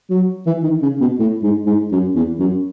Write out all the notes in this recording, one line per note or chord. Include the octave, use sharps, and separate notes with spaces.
F#3
E3
D#3
C#3
B2
A2
G#2
G#2
F#2
E2
F#2